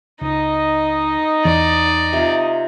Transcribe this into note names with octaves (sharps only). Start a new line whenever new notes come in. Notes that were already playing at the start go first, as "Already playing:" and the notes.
C#2 D#4 D#5
E2 D5
C3 F4